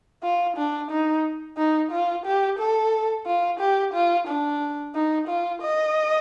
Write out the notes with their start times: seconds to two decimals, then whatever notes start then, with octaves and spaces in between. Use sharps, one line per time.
0.23 F4
0.57 D4
0.91 D#4
1.57 D#4
1.92 F4
2.26 G4
2.59 A4
3.26 F4
3.60 G4
3.94 F4
4.27 D4
4.94 D#4
5.28 F4
5.62 D#5